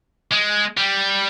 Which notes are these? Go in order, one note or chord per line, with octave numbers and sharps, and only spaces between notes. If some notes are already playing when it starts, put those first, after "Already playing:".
G#3
G3